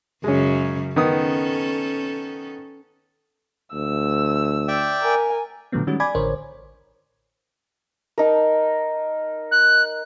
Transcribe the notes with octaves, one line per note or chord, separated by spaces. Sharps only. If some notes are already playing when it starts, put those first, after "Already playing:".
F#2 C#3 G#3 C#4
D#3 B3 C#4 A4 D#6
D2 E6
D5 E5 G5
A#4 G#5
A#2 D3 F3 F#3 A3 B3
D#3 G3 G#3 C#4 F#4
D5 G#5 B5 D6 G#6
A1 D3 A#4 C5 C#5
D#4 A#4
F#6